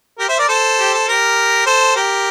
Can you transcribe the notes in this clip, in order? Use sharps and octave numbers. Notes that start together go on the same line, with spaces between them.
G4 A#4
C5 E5
A#4 D5
A4 C5
G4
A4
G4 A#4
A4 C5
G4 A#4